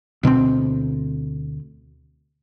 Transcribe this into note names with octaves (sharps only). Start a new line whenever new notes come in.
D2 B2 G#3 C4